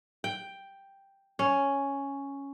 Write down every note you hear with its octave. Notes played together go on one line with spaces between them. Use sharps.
G5
C#4